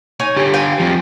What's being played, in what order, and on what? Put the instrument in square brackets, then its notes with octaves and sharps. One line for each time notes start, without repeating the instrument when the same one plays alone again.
[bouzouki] C#4 D#4 G#5
[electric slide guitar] D3 G4
[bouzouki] F5 G5 G#5
[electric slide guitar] F3 G3 C4